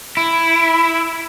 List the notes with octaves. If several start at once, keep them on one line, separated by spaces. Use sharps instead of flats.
E4